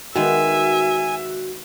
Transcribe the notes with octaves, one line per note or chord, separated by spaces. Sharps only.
D#3 G#3 B3 F#4 E5 G#5